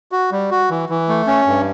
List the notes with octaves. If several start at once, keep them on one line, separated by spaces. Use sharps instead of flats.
F#4
G3
F#4
E3
E3
A3
C#4
G2